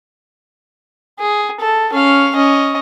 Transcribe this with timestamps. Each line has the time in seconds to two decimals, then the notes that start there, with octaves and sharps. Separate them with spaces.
1.19 G#4
1.60 A4
1.93 C#4 F5
2.35 C#4 D#5